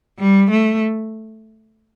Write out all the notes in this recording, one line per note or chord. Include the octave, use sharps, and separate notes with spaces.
G3
A3